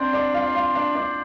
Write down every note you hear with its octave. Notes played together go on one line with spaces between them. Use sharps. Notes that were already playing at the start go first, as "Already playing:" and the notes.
Already playing: C4 D4 C5 D5
D4 D5
F4 F5
D5
F4 F5
D4 D5
D4 D5